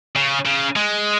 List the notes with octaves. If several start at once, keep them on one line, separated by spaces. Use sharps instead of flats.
C#3
C#3
G#3